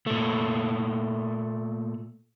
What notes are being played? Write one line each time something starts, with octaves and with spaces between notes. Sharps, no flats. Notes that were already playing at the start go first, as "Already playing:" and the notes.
A#2 A3